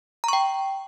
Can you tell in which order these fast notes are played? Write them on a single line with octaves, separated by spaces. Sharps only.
A#5 C#6 G5